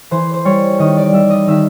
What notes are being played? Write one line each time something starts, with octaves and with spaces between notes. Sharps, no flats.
E3 C5
C5
G3 C#5
D#3 D#5
D5
G3 E5
D#5
D#3 E5